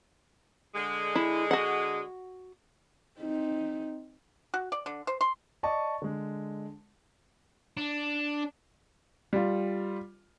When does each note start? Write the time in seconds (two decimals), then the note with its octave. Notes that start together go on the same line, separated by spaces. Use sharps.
0.75 D3 G#3
1.16 E4
1.51 F#4 F#5
3.20 C4 D#4
4.54 F#4
4.72 D5
4.86 D3
5.07 C5
5.21 C6
5.63 D5 D#5 A5 C#6
6.02 D3 G#3
7.77 D4
9.33 G3 F4